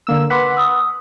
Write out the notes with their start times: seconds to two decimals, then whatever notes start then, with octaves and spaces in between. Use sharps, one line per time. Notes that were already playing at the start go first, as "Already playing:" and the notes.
0.07 D3 A#3 E6
0.30 B4 F#5 C6 D6 B6
0.57 D#6 E6